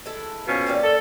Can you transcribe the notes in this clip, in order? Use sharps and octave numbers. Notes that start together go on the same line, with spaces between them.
G#3 E4 A4
B2 F3 C#4
A#3 G4 D5
A4